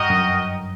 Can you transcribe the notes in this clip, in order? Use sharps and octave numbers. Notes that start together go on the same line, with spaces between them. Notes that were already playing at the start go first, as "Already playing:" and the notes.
Already playing: G2 F#4 A#4 D#5 G5
F#2